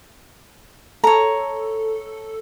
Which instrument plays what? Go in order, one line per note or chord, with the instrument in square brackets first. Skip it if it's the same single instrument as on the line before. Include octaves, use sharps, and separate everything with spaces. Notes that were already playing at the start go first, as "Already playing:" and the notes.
[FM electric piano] A4 [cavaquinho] C#5 A#5